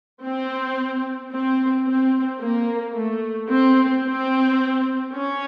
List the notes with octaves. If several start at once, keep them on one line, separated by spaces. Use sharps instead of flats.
C4
C4
C4
A#3
A3
C4
C4
C#4